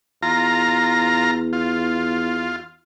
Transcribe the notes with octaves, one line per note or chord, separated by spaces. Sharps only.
E2 F4 A#5
F4